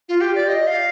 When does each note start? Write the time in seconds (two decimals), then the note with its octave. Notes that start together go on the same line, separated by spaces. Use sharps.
0.09 F4
0.21 G4
0.35 D5
0.48 D#5
0.67 F5